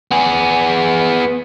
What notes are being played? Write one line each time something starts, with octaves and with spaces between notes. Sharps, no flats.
B3 G#4